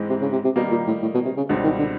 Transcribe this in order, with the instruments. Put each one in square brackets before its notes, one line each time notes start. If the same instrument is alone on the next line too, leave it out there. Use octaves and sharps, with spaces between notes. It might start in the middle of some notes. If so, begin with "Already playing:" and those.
Already playing: [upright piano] G#2 E3 G#3 C4
[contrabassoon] C3
C#3
C3
C3
[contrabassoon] B2 [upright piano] D#3 G3 A#3 D#4
[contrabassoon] A#2
A2
A2
B2
C3
C#3
[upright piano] C#2 B2 G3 C4 [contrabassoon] D3
[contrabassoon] D#3
D3